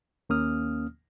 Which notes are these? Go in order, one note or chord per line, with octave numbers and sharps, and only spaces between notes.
D#2 A#3 C#4 D#6 F6